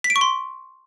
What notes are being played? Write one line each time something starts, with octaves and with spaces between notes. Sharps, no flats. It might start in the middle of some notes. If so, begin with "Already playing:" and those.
B6
D7
C#6
C6